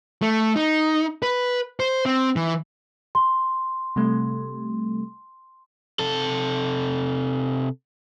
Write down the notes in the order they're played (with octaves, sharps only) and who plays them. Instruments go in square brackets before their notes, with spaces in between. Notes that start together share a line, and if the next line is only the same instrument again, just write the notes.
[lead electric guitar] A3
D#4
B4
C5
C4
E3
[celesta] C6
[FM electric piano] C3 G3 A3
[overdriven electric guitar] C3 A4